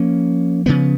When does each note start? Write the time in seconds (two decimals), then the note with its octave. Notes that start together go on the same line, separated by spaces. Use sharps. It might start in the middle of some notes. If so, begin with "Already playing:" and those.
Already playing: F3 A#3 C#4
0.66 C#3 F3 B3